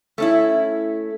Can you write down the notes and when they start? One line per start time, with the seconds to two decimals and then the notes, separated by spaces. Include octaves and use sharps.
0.18 A3 C#4 E4